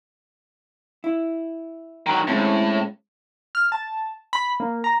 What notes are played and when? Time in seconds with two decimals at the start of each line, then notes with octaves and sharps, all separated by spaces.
1.04 E4
2.06 D#3 F#3
2.28 A2 G#3 C4 C#4
3.55 F6
3.72 A5
4.33 B5
4.60 A#3
4.84 A#5